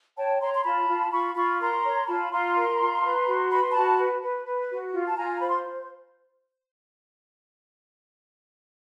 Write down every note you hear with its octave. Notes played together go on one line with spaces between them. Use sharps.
C#5 G5 A5
C#5 A#5 C6
C6
F4 A5 B5
F4
F4 B5 C#6
F4 B5 C#6
A#4 A#5 C6
C#5
F4 A5 B5
F4 A#5 C6
A#4
F4
B4
F#4
B4 B5
C6
F#4 A5 B5
B4
B4
B4
F#4
F4
A5
F4 G#5 A#5
C5 B5
C6